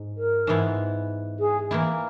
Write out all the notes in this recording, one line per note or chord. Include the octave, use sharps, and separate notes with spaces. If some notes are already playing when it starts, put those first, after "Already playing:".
Already playing: G#2
A#4
G#2 E3 B3 E4
G#4
E3 A#3 E4